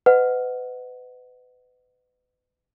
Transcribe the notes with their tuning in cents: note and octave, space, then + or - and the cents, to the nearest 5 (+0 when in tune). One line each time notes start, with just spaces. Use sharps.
B4 +30 D#5 -20 F#5 +0